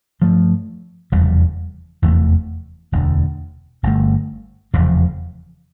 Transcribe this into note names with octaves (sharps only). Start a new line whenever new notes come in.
G2 F3 A3
F1 E2 C#3 G3
F1 E2 E3 A3
E1 D2 D3
G1 G2 D3 A3
F1 E2 C#3 F3